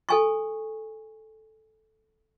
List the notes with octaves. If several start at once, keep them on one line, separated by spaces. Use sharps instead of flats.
A4 G#5 C#6